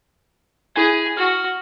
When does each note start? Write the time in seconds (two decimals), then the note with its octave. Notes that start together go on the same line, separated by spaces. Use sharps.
0.76 E4 G#4 G#5 G#6
1.17 F#4 F6